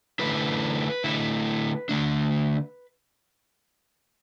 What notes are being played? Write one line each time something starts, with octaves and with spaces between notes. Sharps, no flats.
D3 A3 E4 B4
D3 A3 E4
D3 A3 D4